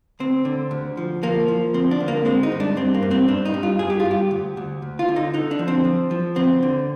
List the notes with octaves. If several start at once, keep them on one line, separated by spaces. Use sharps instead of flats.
D2 C4
D3
D2
F3
F3 A#3
F3
D2 C4
D4
D2
A#3
G#3 C4
D#4
G2
D4
G2 C4
A#3
G2
C4
G2 D4
D#4
G2
F4
G2 G#4
G4
F4
G2
G4
D2
D2
D2
F4
D3
D#4
D3 D#4
D4
F3
C4
F3
F3
D2 C4
D3